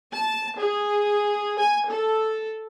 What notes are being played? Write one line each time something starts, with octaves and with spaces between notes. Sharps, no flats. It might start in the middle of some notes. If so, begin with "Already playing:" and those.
A5
G#4
G#5
A4